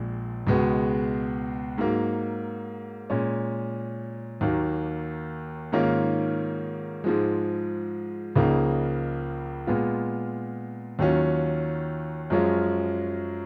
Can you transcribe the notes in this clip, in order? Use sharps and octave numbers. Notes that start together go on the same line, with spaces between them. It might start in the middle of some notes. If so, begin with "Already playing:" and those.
Already playing: A#1 A#2 G#3
C#2 B2 G#3 B3
G#2 F#3 A#3
A#2 G#3 C#4
D#2 D#3 F#3 A#3
G#2 D#3 A#3 C#4 F4
G#2 F3 G#3
C#2 C#3 F3 A#3 D#4
A#2 G#3 B3 F4
D#2 D#3 F#3 C#4 F4
F#2 F3 G#3 C#4 F4